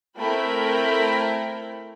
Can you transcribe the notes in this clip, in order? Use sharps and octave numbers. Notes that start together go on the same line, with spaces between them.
A3 C4 E4 A#4 G5 B5